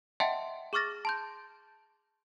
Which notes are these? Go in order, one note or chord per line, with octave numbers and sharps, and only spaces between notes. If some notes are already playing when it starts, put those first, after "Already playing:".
D#5 E5 F#5 G5 A5 C6
G#4 C#6 D6 F6 A6 A#6
A5 C6 G6